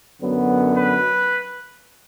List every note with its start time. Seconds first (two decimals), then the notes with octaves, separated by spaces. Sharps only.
0.22 F#2 D3 F#3 B3
0.74 B4